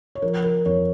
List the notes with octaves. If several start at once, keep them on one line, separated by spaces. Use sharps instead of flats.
C#5
F3 A#4
A#4
F2 C#5